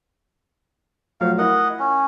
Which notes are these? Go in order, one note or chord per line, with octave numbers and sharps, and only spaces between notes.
F3 F#3 A3 F5
E4 A#4 D#5 F#5
C#4